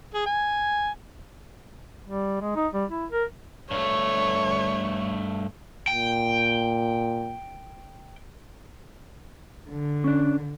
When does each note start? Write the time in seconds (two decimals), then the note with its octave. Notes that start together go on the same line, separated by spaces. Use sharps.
0.14 G#4
0.26 G#5
2.04 G3
2.41 G#3
2.56 D#4
2.73 G3
2.90 E4
3.11 A#4
3.71 G2 A3 C#5
5.88 A#2 G5
9.68 D3
10.04 C#4 D4